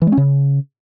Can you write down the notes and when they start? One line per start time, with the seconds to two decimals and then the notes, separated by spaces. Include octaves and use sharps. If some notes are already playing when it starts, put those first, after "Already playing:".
0.02 E3
0.07 G#3
0.12 C#4
0.17 C#3